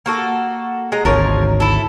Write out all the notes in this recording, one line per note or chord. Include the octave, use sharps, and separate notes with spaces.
A#3 F#4 A4
G#3 D#5 A#5
G#1 D2 F3 A#4 C#5
E4 A4